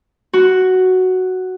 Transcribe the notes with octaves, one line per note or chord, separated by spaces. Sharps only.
F#4